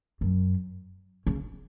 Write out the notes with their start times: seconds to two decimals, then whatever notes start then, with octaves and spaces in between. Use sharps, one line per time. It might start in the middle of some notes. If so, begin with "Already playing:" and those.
0.21 F#2
1.27 C#3